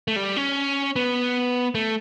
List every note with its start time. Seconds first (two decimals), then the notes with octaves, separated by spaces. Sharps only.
0.08 A3
0.16 G3
0.36 C#4
0.96 B3
1.75 A3